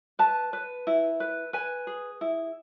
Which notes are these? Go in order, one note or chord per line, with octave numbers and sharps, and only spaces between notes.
B4 A5
B4
E4
B4
B4 G#5
G#4
E4